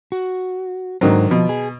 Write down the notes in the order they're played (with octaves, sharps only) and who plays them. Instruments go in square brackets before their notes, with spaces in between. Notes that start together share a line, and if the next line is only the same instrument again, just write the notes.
[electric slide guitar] F#4
[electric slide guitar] G#2 B2 C5 [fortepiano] D3 D#3 F#3
[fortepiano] B2 [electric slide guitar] F3
[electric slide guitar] G#4